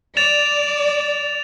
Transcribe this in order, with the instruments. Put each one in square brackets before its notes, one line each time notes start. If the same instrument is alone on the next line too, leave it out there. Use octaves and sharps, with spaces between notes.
[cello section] D5 [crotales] A6 E7 F7